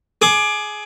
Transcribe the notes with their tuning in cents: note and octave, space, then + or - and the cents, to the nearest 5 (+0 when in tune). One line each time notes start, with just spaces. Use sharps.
G#4 +20 D6 +20